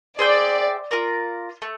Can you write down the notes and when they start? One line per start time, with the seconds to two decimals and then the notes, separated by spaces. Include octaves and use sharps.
0.19 G#4 C5 D5 E5 G5
0.91 F4 A#4 D5
1.62 A3